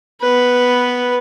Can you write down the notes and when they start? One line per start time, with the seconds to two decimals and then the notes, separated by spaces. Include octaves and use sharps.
0.21 B3 B4